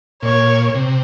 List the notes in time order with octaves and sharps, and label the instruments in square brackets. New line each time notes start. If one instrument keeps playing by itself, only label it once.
[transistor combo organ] A#2 [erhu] C#5
[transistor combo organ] C3